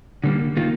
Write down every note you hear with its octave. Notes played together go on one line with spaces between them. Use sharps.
D3 G3 A#3
D#3 A#3 F4